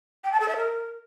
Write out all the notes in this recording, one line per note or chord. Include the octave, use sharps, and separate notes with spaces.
G5
A5
A4
E5
A#4